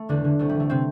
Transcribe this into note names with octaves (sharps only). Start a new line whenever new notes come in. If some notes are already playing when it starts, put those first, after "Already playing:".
Already playing: A3
E2 D3 D4
D3
C2 A3
G3
E3
A3
C3 C4